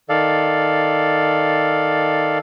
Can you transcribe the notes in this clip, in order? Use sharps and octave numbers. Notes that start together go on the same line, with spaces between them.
D#3 A4 D5 F5